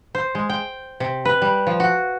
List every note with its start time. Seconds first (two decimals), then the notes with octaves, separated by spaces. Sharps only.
0.15 C5
0.35 G#3
0.50 G5
1.00 C3
1.25 B4
1.42 G3
1.67 F3
1.80 F#4